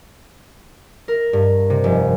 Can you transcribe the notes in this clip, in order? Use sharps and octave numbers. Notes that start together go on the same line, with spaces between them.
A#4
G2
C3
F1